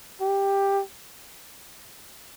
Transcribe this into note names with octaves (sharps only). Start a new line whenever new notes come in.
G4